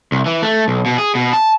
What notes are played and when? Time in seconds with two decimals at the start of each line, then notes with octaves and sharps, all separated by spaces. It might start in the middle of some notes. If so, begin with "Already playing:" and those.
0.12 C2
0.26 E3
0.43 A3
0.68 B1
0.86 B2
0.98 G#4
1.15 B2
1.33 A5